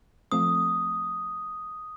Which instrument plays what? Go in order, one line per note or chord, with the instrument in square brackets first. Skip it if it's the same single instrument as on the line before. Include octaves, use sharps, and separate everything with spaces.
[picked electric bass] F3 A3 C4 [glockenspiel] D#6